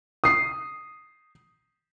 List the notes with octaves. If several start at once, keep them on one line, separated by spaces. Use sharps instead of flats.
D#6 C7